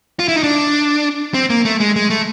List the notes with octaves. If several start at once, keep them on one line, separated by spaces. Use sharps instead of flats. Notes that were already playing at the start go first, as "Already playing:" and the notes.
F4
E4
D#4
D4
C4
A#3
A3
G#3
G#3
A3